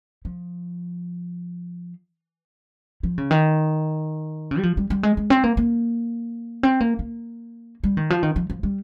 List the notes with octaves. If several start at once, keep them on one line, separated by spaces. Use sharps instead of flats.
F3
F3
C#3
D#3
C#3
G3
F3
G3
G3
G#3
G#3
C4
A#3
A#3
C4
A#3
A#3
G3
D#3
F3
D#3
F3
F3
G3